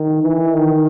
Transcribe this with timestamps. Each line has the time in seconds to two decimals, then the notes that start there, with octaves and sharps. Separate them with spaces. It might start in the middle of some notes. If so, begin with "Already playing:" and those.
Already playing: D#3
0.23 E3
0.54 D#3